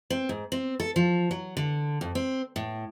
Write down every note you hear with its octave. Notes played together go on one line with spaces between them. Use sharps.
C4
G#2
C4
A4
F3
F#3
D3
F2
C4
A2